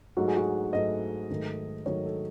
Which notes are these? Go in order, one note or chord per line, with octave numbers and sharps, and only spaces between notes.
G#2 F#3 A3 F#4
G#4
F#4
G#2 F#3 A3 D#5
G#2 D#3 F#3 A3
G#2 D#3 F#3 A3 C#5
A4